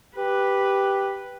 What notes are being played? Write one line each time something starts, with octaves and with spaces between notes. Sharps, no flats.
G4 B4